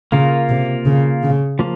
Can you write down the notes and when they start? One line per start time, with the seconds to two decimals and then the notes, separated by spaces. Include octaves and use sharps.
0.12 C#3 A#3 F4 A#4
0.49 C3
0.86 C#3
1.23 C#3
1.59 F3 A#3